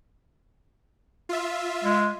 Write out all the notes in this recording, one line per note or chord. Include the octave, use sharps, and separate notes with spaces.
F4 E5
G#3